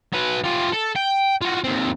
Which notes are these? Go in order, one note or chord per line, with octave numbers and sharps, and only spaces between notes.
F#3 B4
F4 G4
A4
G5
F4 F#4
D#2 C4